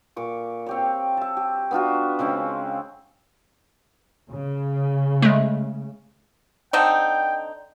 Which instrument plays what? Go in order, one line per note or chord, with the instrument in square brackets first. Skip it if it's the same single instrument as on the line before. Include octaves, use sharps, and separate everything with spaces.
[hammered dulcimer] A#2 C#6 D6
C4 G4 C#5
E5 A5
G4
B3 D4 F4 F#4
C#3 G#3 C4 C#4
[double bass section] C#3
[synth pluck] G#3 A3
[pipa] D3 C4 D#4 [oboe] G5